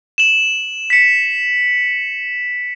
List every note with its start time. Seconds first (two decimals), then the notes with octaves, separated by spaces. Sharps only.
0.18 E7 F#7
0.90 B6 C#7